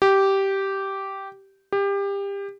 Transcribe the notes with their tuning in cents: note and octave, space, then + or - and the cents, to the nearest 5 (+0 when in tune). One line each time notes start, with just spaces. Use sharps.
G4 -10
G4 +25